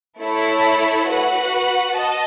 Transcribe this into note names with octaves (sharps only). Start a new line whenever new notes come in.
A3 E4 A4 C#5
F#4 B4 F#5
D#5 A5